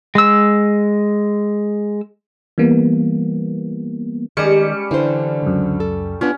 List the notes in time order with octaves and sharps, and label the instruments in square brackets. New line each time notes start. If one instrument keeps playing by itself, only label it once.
[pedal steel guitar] G#3 E6
[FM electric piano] E3 G3 A#3 B3
[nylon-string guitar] D#3 D#5 [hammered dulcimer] G3 C#4 [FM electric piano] G#3 D6 C#7
[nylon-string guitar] D3 C5 [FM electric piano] E3 D4
[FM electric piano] C#2 F#2
[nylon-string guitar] A4
[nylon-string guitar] B3 D4 F4 [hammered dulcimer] C#4